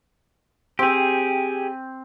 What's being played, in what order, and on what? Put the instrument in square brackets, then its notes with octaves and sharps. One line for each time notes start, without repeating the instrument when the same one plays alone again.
[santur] C4 [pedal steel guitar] G4 G#4